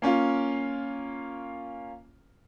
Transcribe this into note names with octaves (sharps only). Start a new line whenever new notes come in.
A#3 C#4 F4